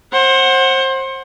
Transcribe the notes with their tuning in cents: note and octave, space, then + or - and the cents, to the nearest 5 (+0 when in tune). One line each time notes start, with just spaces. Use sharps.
C5 +30 F#5 +0